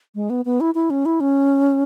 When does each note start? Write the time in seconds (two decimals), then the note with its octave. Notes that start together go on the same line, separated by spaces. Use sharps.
0.15 G#3
0.30 B3
0.45 B3
0.61 E4
0.75 E4
0.90 C#4
1.06 E4
1.20 C#4